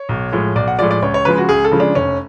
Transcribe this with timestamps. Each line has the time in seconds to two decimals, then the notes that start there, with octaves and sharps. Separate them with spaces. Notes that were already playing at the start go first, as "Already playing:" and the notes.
Already playing: C#5
0.09 B1
0.32 A2 F3 G#3
0.55 B1 D5
0.68 F#5
0.79 A2 F3 G#3 D5
0.91 D5
1.02 C#2 C#5
1.14 C#5
1.25 C#3 F3 G#3 B4
1.38 F#4
1.49 C#2 G#4
1.64 A4
1.72 C#3 F3 G#3
1.80 D4
1.95 F1 C#4